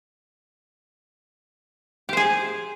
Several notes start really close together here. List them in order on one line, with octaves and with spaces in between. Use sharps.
G4 C5 G#4